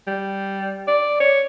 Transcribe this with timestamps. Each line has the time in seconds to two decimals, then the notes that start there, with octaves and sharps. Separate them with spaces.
0.07 G3
0.88 D5
1.20 C#5